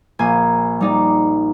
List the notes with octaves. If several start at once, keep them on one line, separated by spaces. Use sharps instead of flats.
A#1 A#3 G#5
G3 D#4 D5